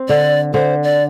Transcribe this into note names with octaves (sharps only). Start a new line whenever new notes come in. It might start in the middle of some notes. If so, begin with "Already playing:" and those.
Already playing: C4
D3 D5
D3 C5
D5